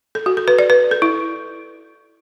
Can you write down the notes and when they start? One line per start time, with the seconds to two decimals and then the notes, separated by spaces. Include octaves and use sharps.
0.15 A4
0.26 F#4
0.37 A4
0.48 B4
0.59 D5
0.70 B4
0.91 A4
1.02 E4